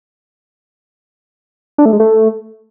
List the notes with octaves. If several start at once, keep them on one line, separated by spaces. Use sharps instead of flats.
D4
A3
G#3
A3